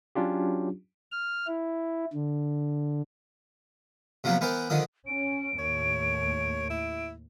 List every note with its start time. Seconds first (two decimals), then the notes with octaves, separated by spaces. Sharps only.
0.15 F#3 C#4 D4 F4 G4
1.12 F6
1.47 E4
2.13 D3
4.24 C3 F3 F#3 A#3 B3
4.41 E3 B3 A#4 C5
4.70 D3 D#3 F3 D#6
5.07 C#4 D7
5.59 D#2 A2 C#5
6.70 E4